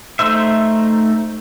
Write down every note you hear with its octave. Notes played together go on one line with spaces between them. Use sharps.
A3 D#4 C5 E5